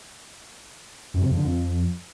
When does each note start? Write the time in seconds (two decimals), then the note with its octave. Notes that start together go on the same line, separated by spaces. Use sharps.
1.14 F#2
1.22 C3
1.30 F2
1.37 D3
1.45 F2